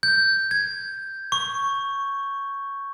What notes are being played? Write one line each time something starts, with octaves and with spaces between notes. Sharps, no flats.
G6
G#6
C#6